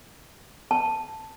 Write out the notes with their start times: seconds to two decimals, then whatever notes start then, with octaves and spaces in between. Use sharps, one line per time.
0.71 A5